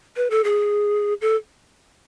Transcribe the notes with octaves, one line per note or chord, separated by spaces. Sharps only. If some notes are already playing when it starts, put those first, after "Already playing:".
B4
A4
G#4
A4